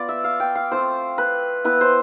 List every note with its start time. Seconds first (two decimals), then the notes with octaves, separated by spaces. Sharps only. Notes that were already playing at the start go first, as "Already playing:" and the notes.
Already playing: B3 F4 D5
0.09 E5
0.24 F5
0.40 G5
0.55 F5
0.71 A3 C4 F4 C5
1.18 B4
1.65 B3 E4 B4
1.81 C5